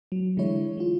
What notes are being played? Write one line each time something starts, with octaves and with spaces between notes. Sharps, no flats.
F#3
D3 E3 G#3 E4 C#5
G#3 F4